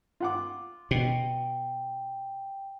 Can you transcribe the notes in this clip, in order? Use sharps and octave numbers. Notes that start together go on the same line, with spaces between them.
F4 F#5 D6
B2 G5